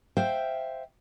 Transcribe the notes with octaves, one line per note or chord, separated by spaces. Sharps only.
C5 E5 F5 G5